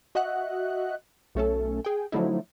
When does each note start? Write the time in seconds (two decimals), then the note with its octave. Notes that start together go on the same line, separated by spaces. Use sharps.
0.15 F#4 D#5 E5 F#5 F#6
1.35 B1 A3 C#4 A4
1.85 G#4 G5
2.12 D3 F3 F#3 A3 D#4 E4